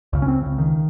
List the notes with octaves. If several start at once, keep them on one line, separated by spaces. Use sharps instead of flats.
C#2 C#3
C#4
C4
C#2 C#3
D#3